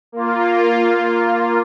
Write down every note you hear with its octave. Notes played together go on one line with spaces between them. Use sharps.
A#3 F4